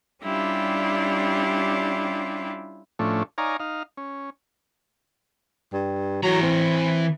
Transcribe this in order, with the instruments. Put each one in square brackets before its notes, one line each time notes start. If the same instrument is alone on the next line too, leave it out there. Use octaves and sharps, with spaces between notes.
[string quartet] G3 C#4 D4 E4 F4 G4
[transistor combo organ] A2 F3 A3 C#4 D4
D#4 C#5 D5 F5 G#5 A#5
D#4 F5
C#4
[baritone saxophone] G2
[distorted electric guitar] E3 A#5 [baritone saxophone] F#3
[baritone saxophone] C4